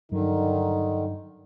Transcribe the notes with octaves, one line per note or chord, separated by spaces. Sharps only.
G2 D3 D#3 F#3 D#4